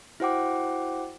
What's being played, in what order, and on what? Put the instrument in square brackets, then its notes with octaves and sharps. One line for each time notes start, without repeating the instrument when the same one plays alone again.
[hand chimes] E4 F#4 C5 F#5 G5 D6